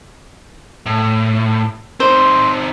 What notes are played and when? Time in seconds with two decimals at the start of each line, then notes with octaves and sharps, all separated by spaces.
0.86 A2
2.00 C4 D#4 C5